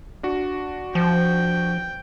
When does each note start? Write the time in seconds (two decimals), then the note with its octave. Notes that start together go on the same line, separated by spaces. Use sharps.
0.23 D4 F#4
0.95 F3 G5